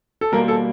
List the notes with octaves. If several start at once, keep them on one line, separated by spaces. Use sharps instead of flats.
A4
B2 G3 A#3 A#4
A4